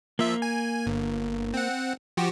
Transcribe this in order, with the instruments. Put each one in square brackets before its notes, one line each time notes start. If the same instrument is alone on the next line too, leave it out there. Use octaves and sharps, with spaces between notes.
[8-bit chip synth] F3 E5 [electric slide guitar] A#3
[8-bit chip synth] G#5
G1
C4 F#5
F3 F#4 G4